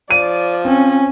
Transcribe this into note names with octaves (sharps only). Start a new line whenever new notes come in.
F3 D5 D#7
C4 C#4